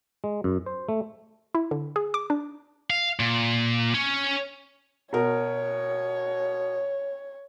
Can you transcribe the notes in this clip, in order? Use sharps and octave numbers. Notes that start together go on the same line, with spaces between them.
G#3
F#2
C5
A3
E4
D3
G#4
D6
D4
F5
A#2
C#4
B2 A#4 C#5